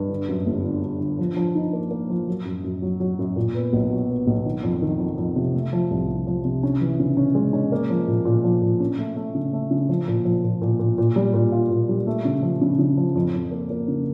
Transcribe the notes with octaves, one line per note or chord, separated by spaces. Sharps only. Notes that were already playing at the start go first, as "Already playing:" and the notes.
Already playing: G2
D3
F#2
G1
D3
D3
D3
F3
F3
D#4
A#3
A#3
F3
F#3
F#2
F#2
F#3
F#3
F#2
A#2
B3
B1
F#3
B3
B1
D#3
F2
D#3
F2
F2
C3
A3
F3
C2
C3
F3
C3
C#4
E3
C#3
C#4
G#3
C#4
A#3
F3
A#2
A#2
F3
A#2
C#4
A3
A3
C#3
A3
C#3
F3
A#2
F3
A#2
A#2
A#2
A#2
G3
A#2
F4
A#2
G3
A3
C#3
F3
C#3
C#3
F3
F2
F2
A#3
A#3
C#3